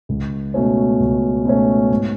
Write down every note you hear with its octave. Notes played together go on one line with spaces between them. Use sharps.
C#2
B2 A3 C#4
C#2
B2 A3 C#4
G#2